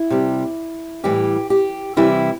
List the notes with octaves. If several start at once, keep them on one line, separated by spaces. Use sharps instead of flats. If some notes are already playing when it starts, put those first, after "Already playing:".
Already playing: E4
C3 G3
A2 E3 G3 G4
G4
C3 E3 G3 E4